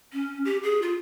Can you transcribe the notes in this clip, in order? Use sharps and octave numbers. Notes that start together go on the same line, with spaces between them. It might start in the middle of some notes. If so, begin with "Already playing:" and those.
C#4
G4
G#4
F4